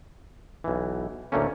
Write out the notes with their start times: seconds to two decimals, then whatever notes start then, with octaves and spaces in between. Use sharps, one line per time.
0.64 B1 E3
1.32 D2 A2 D3 A3 A#3 C#4